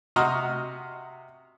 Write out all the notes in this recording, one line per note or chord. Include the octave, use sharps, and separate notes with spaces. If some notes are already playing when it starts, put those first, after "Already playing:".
C3 F#4 D#5 A#5 C6 F6